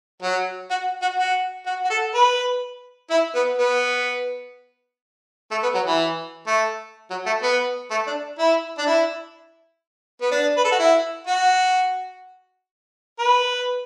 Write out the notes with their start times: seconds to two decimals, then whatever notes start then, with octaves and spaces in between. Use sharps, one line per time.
0.22 F#3
0.71 F#4
1.02 F#4
1.19 F#4
1.66 F#4
1.84 F#4
1.90 A4
2.15 B4
3.10 E4
3.35 B3
3.58 B3
5.51 A3
5.63 B3
5.75 F#3
5.87 E3
6.47 A3
7.11 F#3
7.26 A3
7.42 B3
7.91 A3
8.07 D4
8.39 E4
8.78 D4
8.87 E4
10.22 B3
10.32 D4
10.57 B4
10.65 A4
10.72 F#4
10.79 E4
11.27 F#4
13.19 B4